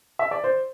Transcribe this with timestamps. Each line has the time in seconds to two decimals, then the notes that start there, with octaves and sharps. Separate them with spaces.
0.19 E5
0.31 D5
0.44 C5